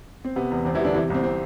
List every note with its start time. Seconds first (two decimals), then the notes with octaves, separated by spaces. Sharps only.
0.25 C4
0.36 C3 B3
0.51 E2
0.65 E2 C4
0.75 E3 E4
0.80 D3 G3 D4
0.94 C3 E3 E4
1.10 C2 C4
1.24 C4